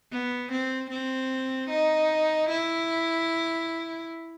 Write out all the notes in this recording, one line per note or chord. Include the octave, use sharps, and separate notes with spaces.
B3
C4
C4
D#4
E4